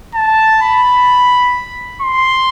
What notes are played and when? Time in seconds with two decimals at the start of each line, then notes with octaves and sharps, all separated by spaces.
0.14 A5
0.62 B5
2.02 C6